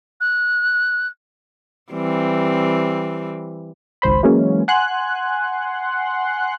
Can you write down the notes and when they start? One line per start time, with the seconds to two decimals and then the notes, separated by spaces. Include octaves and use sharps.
0.21 F#6
1.92 E3 G3 C4
4.02 G#1 C#2 C5 B5
4.23 E3 F#3 G#3 A#3 C#4
4.68 F#5 G#5 C6 F#6